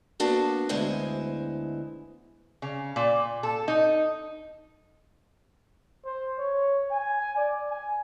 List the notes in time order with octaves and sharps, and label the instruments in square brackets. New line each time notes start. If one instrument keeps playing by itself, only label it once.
[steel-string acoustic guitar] A#3 B3 D4 F#4 A4
D2 G#3 B3 E4 C5 G#5
[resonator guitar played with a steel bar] C#3
A#2
A4
D#4
[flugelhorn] C5
C#5
G#5
D5
G#5